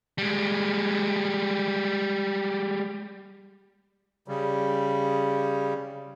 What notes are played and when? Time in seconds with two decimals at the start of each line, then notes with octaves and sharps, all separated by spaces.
0.18 G3 G#3
4.28 C#3 G3